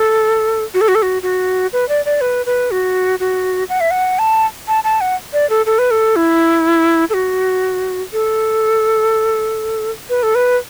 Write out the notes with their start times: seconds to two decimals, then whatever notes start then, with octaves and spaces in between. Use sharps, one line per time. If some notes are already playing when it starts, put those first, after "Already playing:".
Already playing: A4
0.74 F#4
0.81 A4
0.88 F#4
0.95 A4
1.02 F#4
1.23 F#4
1.73 B4
1.89 D5
2.05 D5
2.21 B4
2.46 B4
2.71 F#4
3.20 F#4
3.69 F#5
3.81 E5
3.91 F#5
4.19 A5
4.68 A5
4.84 A5
5.01 F#5
5.33 D5
5.50 A4
5.66 A4
5.79 B4
5.91 A4
6.16 E4
7.10 A4
7.14 F#4
8.13 A4
10.10 B4
10.23 A4
10.35 B4